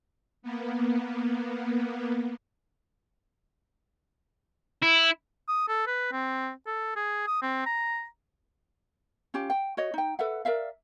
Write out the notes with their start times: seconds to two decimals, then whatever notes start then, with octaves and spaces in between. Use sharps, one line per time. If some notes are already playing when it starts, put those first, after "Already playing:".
0.42 A#3 B3
4.83 E4
5.48 D#6
5.68 A4
5.87 B4
6.12 C4
6.66 A4
6.96 G#4
7.27 D#6
7.42 C4
7.66 A#5
9.34 C#4 F4 G4
9.50 G5
9.77 F#4 C#5 D#5
9.94 D#4 G5
10.19 A4 B4 E5 F#5
10.45 A#4 D5 E5 F5